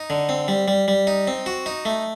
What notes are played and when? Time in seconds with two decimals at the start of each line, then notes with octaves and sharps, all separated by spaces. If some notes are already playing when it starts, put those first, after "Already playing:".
Already playing: D#4
0.10 D3
0.29 C4
0.48 G3
0.68 G3
0.88 G3
1.07 D#4
1.27 C4
1.46 F#4
1.66 D#4
1.85 A3